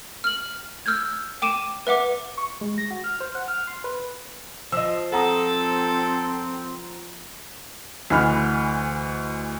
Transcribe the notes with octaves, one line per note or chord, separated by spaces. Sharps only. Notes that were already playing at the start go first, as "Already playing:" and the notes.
F6 F#7
E6 F6 G6 G#6
G5 D6 D#7 E7
B4 E5 F#5 D6
C#6
G#3
A#6
F#4
F6
C5
F#5
F6
C6
B4
F3 D#5 E6
C4 A4 F#5 A#5 D#6
D2 E3 D#5 B5 F6